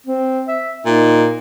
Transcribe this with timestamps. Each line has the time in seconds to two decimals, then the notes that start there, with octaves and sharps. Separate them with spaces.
0.06 C4
0.48 E5
0.86 A#2 D#4